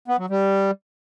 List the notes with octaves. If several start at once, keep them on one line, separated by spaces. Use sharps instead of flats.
B3
F#3
G3